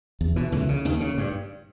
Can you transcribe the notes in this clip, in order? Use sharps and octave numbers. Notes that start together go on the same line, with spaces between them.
E2
B2 E3
C#2 E3
C#3
D#2 D#3
C#3
G2